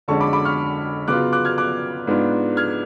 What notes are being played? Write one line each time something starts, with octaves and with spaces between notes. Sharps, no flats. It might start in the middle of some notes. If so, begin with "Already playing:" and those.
F2 D3 G#3 C#4 A5 C#6
B5 D6
B5 D6
C#6 F6
C#3 F#3 B3 F4 D6 F#6
D6 F#6
F6 G#6
D6 F#6
G#2 G#3 B3 D4 F4
F6 G#6